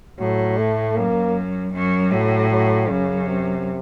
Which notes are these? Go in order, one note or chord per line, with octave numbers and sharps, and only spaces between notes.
A2 F#3
A3
F#2 A#3
F#2
A2 F#3
F#3
F#2 C#3
C3